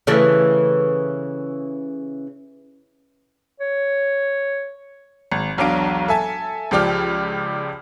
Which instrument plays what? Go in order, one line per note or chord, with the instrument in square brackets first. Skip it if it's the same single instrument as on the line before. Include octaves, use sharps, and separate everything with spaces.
[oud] C#3 E3 A3
[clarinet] C#5
[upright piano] G#1
E1 B1 F#3 D4 F5 D7
A4 E5 G#5 A5
C#2 F3 G4 D5 F6